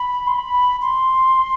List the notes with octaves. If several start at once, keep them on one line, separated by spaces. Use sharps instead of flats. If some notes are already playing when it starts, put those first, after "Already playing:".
Already playing: B5
C6
B5
C6